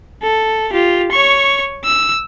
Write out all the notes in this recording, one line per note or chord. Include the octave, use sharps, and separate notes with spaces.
A4
F4 G4
C#5 C#6
E6